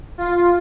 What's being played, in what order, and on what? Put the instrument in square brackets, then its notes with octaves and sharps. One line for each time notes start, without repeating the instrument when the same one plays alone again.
[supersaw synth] F4